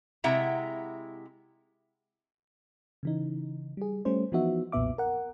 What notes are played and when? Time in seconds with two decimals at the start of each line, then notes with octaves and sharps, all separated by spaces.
0.24 C3 G#3 E4 E5 F#5 A#5
3.03 C#3 E3 D#4
3.77 G3 G#4
4.05 G3 A3 C#4 C5
4.32 E3 F3 B3 D#4 F#4 E5
4.72 B1 F2 A#2 B3 E5 D6
4.98 A#4 F#5